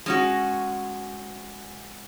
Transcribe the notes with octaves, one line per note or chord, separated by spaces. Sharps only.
G#3 C#4 F#4